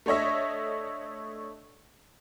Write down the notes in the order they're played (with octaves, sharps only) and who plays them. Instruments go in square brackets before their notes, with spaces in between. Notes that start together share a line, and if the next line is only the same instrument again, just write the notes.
[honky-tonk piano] A3 D4 C#5 D#5 E5